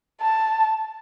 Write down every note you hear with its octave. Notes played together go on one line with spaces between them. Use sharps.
A5